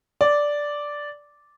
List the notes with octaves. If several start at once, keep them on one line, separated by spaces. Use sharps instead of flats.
D5